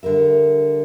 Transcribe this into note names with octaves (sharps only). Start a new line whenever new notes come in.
D3 G3 A#4 E5